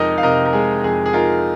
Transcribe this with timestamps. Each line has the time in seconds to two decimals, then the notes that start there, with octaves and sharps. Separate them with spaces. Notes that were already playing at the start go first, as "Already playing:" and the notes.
Already playing: F2 C3 G#3 D#4 A#4 D#5
0.18 F5
0.23 C3 A#4 D#5
0.45 A#4
0.53 G#3 G#4
0.84 F2 G#4
1.06 G#4
1.13 D#4 F4 A#4